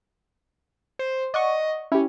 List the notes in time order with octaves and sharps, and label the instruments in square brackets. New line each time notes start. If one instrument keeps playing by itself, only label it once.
[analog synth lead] C5
[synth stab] D5 F#5 C#6 [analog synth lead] D#5
[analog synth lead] C#4 [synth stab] E4 G4